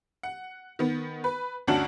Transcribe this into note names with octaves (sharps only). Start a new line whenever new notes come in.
F#5
D#3 B3
B4
G1 D2 C#4 D4 F#4 F#7